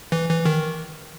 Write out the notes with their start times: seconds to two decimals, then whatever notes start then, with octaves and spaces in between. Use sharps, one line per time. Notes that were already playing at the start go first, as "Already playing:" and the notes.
0.12 E3
0.29 E3
0.45 D#3